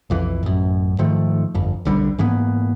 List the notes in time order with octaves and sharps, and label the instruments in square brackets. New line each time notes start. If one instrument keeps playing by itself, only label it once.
[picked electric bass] B1 F2 E3
A1 F#2
G#2 D#3 F3 A3
G1 F2
D#1 B1 D3 G3
G#2 E3 A#3 B3